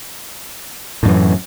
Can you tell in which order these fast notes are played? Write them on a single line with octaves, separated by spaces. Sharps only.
A2 F#2 E3